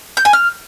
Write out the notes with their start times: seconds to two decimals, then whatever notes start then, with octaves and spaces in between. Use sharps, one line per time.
0.17 G6
0.25 G#5
0.33 F6